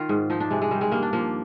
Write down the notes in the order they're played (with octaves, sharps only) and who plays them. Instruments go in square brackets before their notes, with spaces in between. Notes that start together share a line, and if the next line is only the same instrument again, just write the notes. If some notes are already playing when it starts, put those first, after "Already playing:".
Already playing: [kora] D#3 F4
G#2
F3 D#4
D4
C3 G#3
G#3
D#3 G3
G#3
G2 A#3
D4
F3 A#3